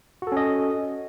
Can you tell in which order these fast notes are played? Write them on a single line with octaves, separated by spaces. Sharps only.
F#4 A4 C#4 D#5